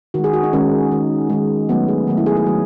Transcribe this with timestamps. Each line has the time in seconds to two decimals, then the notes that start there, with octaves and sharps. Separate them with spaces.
0.14 D#3 G#3 F#4
0.24 G#4
0.33 F#4
0.43 D#4
0.53 D#3 G#3 C#4
0.92 D#3 G#3
1.30 D#3 G#3
1.69 D#3 F#3 A3 B3
1.88 G#4
2.07 D#3 F#3 A3
2.17 E4
2.26 G#4
2.37 G#4
2.46 D#3 F#3 A3